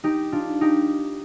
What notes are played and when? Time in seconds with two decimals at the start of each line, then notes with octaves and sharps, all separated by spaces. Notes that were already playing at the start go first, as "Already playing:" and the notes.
0.04 D#4 G4
0.32 D4 F4
0.61 D#4 G4